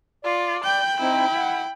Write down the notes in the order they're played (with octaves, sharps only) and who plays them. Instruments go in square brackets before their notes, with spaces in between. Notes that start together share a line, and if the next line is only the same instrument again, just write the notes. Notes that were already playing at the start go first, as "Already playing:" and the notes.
[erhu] F4 [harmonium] D5
[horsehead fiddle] G5 B5 [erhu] G6
[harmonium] C4 D#4 [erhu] E4
[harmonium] F#5